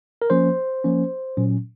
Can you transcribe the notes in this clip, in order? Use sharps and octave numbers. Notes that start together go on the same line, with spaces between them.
A#4
F3 A#3 C#4 C5
F3 A#3 C#4
A#2 F#3 C#4